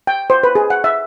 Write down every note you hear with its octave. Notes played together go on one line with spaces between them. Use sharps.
G5
C5
B4
G#4
F#5
E5